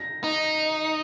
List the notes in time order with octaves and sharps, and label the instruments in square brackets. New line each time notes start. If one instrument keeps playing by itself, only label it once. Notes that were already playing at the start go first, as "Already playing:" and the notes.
Already playing: [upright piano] A#6
[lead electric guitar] D#4